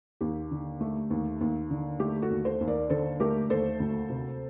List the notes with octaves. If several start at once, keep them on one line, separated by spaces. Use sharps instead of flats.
D#2 G4
D3
A3
D#2
D#2
D3
A3 G4
F#4 A4
D#2
A4 C5
D#2
A#4 D5
D3 A4 C5
A3 G4 A#4
D#2 A4 C5
D2
C3